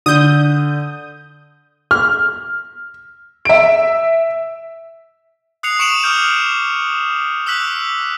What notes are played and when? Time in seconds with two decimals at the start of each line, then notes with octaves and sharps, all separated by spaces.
0.06 D3 D#6 G6
1.91 F6
3.45 E5 D7
5.63 D#6 F#6 C7 C#7 F7
5.79 C#6 C#7 D7 E7 F#7
6.03 D6 D#6 F6 G6 D7
7.46 D6 E6 F#6 B6 F#7